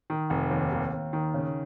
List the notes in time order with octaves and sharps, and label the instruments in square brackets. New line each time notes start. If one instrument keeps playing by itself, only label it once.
[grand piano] D#3
F1
D#2
D#2
D#2
D#3
C#3